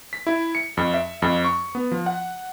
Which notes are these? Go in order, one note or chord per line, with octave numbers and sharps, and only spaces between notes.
B6
E4
C#7
F2
E5
F2
C#6
B3
F3
F#5